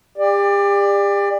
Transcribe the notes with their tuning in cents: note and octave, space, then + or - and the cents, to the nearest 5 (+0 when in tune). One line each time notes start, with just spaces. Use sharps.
G4 +40 D5 +20